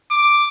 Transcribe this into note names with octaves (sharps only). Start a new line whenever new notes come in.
D6